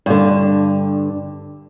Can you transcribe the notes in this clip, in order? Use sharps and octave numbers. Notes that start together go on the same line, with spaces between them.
G2 D3